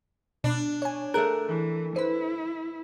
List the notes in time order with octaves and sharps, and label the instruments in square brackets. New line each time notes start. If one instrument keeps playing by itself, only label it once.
[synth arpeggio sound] B2 [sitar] D4
[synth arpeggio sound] C#5 G#5
[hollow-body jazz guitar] A3 A#4 [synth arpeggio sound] G#4 F#6
[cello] E3
[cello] E4 [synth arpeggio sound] B4 C5